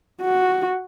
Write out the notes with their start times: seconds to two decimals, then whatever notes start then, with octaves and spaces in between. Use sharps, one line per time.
0.22 F#4